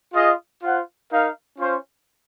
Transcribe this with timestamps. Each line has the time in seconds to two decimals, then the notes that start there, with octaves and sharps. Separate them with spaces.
0.14 F4 G#4 D#5
0.63 F4 C5 F#5
1.11 D#4 A#4 F5
1.59 C#4 F4 C5